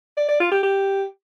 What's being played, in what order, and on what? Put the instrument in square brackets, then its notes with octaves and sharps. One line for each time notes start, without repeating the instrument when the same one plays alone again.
[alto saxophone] D5
D5
F4
G4
G4